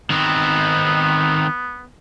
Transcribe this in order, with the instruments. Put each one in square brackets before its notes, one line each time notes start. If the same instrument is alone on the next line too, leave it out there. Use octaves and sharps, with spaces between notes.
[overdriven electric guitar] D#3 C4 [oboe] B3